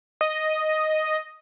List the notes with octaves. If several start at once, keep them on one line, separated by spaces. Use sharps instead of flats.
D#5